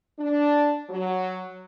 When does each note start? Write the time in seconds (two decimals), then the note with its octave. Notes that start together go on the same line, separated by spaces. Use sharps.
0.19 D4
0.89 F#3